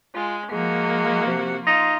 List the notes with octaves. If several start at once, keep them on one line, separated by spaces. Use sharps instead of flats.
G#3 F4
F3 G#3 A#3 F#4
C3
D#4 F4